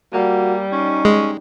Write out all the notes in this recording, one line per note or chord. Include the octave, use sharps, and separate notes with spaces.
G3 A#3 F#4
C#4 D#4
G#3